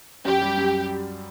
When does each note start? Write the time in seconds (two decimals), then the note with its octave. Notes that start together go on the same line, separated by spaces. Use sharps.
0.25 F#2 G4
0.42 G3
0.57 F#2